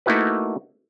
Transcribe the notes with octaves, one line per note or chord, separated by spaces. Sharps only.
A3 A#3 D#4 E4 F#4 B4